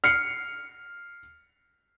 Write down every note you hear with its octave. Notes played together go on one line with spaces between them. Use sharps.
F6 C7 C#7